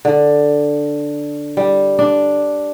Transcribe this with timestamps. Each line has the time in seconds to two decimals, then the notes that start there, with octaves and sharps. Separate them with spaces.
0.05 D3
1.57 G3
1.99 D4